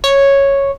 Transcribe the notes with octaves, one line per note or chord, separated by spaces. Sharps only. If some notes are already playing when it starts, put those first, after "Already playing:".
C#5